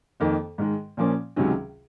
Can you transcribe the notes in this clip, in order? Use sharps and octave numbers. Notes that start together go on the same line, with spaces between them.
F2 D#3 A#3
G#2 D#3 G#3
A#2 F3 A#3 C#4
C#2 C3 D#3 F#3 C#4